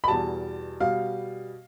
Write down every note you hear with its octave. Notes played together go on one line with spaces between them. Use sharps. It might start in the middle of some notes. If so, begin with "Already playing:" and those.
B5
E2 B2 G3 A5
B2 G3 F5